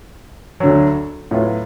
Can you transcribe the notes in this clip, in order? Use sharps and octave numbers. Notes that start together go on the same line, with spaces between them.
D2 D3 F#3
A2 F#3 B3 F4